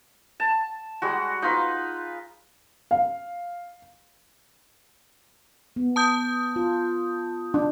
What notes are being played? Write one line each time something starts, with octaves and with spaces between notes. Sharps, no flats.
A5
G3 G#3 F#4
D#4 F4 B4
F5
B3
A5 D#6 G6
F4
D4